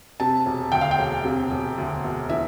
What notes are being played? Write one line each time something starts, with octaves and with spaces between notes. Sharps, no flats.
C3 A5
E1
D2 G5
F5
G5
E1
C3
E1
D2
E1
E3 E5